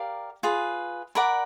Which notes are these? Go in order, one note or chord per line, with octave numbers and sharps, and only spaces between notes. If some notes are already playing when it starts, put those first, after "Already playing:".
Already playing: G4 A#4 D5 F5
F4 G#4 B4
A#4 D5 F#5 B5